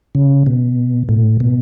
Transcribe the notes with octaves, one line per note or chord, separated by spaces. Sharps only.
C#3
B2
A2
B2